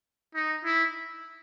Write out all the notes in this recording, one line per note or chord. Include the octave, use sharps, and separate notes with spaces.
D#4
E4